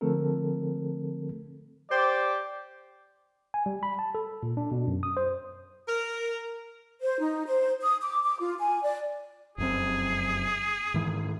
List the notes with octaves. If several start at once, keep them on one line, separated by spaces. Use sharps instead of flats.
D3 F3 A3 C4 A4 A#4
G4 C5 D5
G#5
G3
B5
A5
A4
A#2
D4
B2
F#2
D#6
C5
A#4
C5
D#4
C5
D#6
D6
D6
F4
G#5
D5
F1 F#2 C4 G#4
G#2 D#3 E3